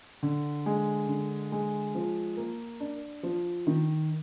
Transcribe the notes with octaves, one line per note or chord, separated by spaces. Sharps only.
D3
G#3
D3
G#3
F3
A#3
D4
F3
D#3